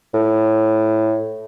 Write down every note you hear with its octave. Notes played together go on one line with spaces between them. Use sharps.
A2